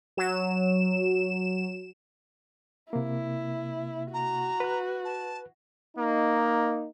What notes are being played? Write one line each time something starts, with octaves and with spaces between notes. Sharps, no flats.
F#3 E7
C3 A#3 E4
F#4 A#5
B4 F#6
A5
A#3 D#4